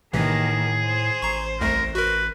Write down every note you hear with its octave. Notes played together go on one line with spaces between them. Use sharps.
A#1 A2 C3 D#3 E3 A#3 G#4
C5
A1 A#5 C#6
C2 F2 A3 A#4
F#4 A#4 B4